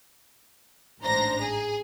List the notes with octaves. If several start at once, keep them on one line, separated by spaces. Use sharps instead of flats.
A1 G#2 D4 C5 A#5 A#6
G#4